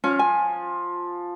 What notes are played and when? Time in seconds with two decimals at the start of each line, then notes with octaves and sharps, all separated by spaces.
0.04 F3 C#4
0.19 G#5